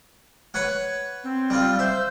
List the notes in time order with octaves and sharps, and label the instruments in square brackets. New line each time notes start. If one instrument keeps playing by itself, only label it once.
[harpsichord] B4 C#5 F#5
[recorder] C4
[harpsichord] G3 F4
[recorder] C5 [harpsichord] E5